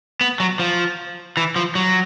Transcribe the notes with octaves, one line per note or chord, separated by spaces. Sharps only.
B3
F#3
F3
E3
F3
F#3